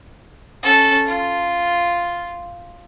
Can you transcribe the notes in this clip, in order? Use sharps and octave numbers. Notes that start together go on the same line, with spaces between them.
C#4 A4
F4